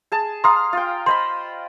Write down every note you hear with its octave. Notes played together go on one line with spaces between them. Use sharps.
G#4 A5
F5 A#5 C6 D#6
F4 G5
C5 D#5 B5 C6